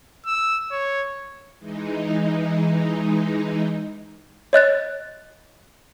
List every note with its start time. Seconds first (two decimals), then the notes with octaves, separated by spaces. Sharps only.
0.26 E6
0.72 C#5
1.59 E3 G#3 D#4
4.53 C#5 D#5 F#6 A6